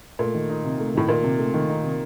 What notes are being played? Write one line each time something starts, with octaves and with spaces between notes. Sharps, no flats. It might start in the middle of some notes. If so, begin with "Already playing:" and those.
A#2 A3
D#3
D#4
C3
A3
A2 D#3
A#2 D#4
C3
A3
D#3
D#4
C3